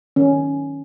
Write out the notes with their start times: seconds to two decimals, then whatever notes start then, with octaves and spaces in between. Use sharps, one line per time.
0.16 D#3 C#4